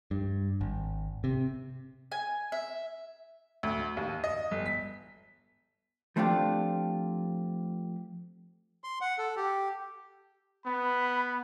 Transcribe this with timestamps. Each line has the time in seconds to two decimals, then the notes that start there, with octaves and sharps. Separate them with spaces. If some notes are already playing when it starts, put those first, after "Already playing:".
0.11 G2
0.61 G#1
1.24 C3
2.12 G#5
2.52 E5
3.63 D2
3.97 D#2
4.24 D#5
4.51 G1
4.66 B6
6.16 F3 A3 C4 D4 F4 G4
8.84 C6
9.01 F#5
9.18 A4
9.37 G4
10.66 B3 B5